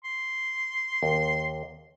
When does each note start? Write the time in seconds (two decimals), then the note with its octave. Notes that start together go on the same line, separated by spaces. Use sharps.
0.04 C6
1.03 D#2